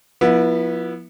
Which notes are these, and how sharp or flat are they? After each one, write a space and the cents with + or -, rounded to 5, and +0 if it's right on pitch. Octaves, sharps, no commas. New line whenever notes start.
F3 +25 B3 -25 E4 +0